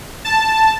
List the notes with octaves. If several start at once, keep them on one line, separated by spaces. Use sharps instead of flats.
A5